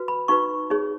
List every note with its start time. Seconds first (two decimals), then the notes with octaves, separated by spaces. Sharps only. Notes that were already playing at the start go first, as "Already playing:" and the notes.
Already playing: F#4 B4
0.08 B5
0.28 D#4 F#4 B4 C#6
0.70 D#4 G#4 C#5